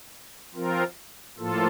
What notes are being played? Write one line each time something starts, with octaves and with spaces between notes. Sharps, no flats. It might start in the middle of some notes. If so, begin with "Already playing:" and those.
F3 C4 F4 A#4
A2 F3 A#3 F4 A4